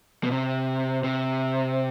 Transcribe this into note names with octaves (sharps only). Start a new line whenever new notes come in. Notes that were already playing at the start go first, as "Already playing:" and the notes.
B2
C3
C3